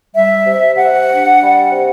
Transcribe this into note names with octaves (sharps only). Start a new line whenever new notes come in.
G3 E5
C3
C3 F#5
D4
G3
C3